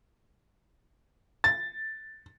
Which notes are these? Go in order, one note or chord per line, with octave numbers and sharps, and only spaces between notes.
A6